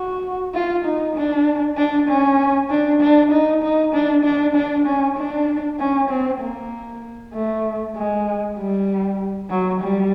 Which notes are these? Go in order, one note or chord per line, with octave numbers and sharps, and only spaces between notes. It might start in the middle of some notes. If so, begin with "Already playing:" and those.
Already playing: F#4
F4
D#4
D4
D4
C#4
D4
D4
D#4
D#4
D4
D4
D4
C#4
D4
C#4
C4
A#3
A3
G#3
G3
F#3
G3